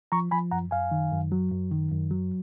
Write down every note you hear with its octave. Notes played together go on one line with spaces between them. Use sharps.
F3 A#5 C#6
F3 G#5 B5
F#2 F#5 A#5
F#2 F5 G#5
D#3
F#2
F#3
F#2
D#3
F#2
F#3